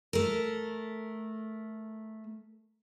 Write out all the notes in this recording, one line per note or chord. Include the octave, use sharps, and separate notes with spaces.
A3 A#4